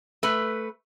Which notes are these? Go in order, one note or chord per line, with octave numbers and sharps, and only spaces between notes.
A3 B4